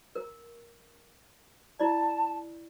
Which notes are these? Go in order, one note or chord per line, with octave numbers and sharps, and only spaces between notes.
A#4
E4 D5 A5